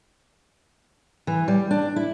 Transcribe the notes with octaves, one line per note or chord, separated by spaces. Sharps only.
E3
G3
D4
E4